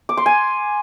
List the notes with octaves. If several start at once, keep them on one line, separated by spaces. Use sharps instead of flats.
D6
C6
G#5